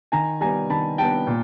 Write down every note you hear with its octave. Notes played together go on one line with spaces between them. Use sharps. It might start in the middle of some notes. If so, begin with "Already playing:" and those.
D#3 G#5 A#5
G3 B3 G#5 A#5
D#3 A5 B5
G3 B3 G5 A5
A#2